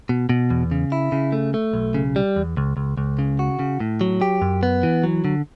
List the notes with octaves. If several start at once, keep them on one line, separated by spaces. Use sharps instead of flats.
B2
B2
E2
C#3
E4
C#3
A3
A3
B1
C#3
G3
E2
C#2
C#2
C#2
C#3
F#4
C#3
A2
F#3
G4
F#2
B3
E3
F#3
D3